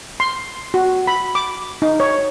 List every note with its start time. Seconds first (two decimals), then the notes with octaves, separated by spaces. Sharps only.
0.20 C6
0.74 F#4
1.07 B5
1.35 D6
1.82 D#4
2.00 C#5